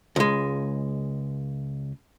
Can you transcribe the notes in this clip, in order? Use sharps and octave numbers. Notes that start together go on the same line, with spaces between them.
C#2 G#3